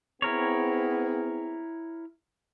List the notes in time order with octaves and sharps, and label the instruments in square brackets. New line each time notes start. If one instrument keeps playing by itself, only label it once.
[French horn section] B3 C4 G#4 [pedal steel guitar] E4 A#4 C#5